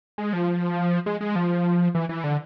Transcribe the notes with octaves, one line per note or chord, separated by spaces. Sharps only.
G#3
F3
G#3
G#3
F3
E3
E3
D3